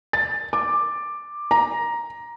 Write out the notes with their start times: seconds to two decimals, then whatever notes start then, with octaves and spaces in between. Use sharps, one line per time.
0.13 A6
0.53 D6
1.51 A#5